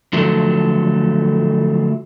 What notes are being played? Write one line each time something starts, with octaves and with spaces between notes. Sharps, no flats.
D3 F3 F#3 A3